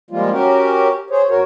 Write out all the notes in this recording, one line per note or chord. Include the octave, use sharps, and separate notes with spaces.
F3 G3 G#3 A#3 F4
C#4 F#4 G4 A#4
G#4 C5 C#5
F#2 F#4 A#4 C#5